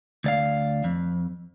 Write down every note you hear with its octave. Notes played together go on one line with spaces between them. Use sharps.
D2 D5 F5
F2